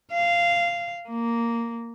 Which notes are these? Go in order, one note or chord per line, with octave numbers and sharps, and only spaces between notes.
F5
A#3